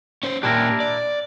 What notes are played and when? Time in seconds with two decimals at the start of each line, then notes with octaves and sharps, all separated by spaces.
0.23 C#4 C5
0.43 A#2 D4 E4 G4 A#4
0.80 D5